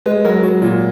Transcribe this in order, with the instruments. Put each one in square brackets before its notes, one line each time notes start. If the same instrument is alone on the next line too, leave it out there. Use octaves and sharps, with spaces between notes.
[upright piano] G#3 [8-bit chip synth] B4
[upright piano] F#3 [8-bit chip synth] A#4
[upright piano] F#3 [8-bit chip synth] F#4
[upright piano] A#2 [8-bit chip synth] F4